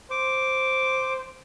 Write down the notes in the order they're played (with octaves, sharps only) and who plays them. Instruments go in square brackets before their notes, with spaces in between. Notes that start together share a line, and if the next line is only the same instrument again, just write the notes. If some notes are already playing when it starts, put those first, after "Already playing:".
[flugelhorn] C5 [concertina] D6